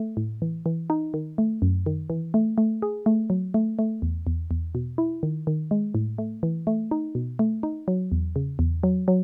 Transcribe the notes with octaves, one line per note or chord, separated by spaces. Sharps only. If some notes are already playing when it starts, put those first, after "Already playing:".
Already playing: A3
A2
E3
E3
D#4
D#3
A3
F#2
D#3
E3
A3
A3
G#4
A3
F#3
A3
A3
E2
E2
E2
B2
E4
D#3
D#3
G#3
A2
A3
E3
A3
D#4
B2
A3
D#4
F#3
E2
C#3
E2
F#3
F#3